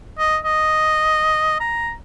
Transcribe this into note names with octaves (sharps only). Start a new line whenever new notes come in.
D#5
D#5
A#5